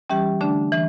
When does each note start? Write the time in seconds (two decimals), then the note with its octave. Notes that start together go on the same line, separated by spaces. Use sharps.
0.10 E3 G3 C#4 G4
0.41 D3 A3 D4
0.72 E3